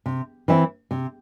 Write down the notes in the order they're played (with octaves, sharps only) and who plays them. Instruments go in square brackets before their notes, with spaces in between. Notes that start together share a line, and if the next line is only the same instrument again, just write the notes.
[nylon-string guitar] C3
E3 C4 E4
C3